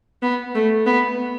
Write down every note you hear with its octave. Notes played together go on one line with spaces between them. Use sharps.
B3
A3
B3